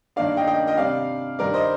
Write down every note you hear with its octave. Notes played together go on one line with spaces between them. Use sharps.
G2 D#3 A#3 D4 D5 F5
D#5 G5
D#5 G5
D#5 G5
C3 G3 D4 D5 F5
G2 D#3 G3 A#4 D5
C5 D#5